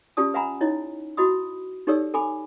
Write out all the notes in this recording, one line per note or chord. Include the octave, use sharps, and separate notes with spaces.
C#4 F4 G4 D5 A5 D#6
B4 E5 F#5 G#5 A#5 B5
D#4 E4 C#5 D#5
E4 F#4 D#5 B5 D#6
D#4 G4 A4 C#5 D5 E6
A4 G#5 B5 D6